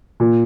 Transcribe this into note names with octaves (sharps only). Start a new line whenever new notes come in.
A#2